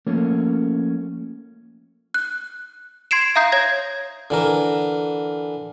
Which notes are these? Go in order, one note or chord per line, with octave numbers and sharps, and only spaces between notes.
F3 A3 A#3 C#4
F#6
C6 G#6 C7 D7 E7
E5 F5 A#5 D#6 G6 C7
C#5 G#6 A#6
D3 E3 A#4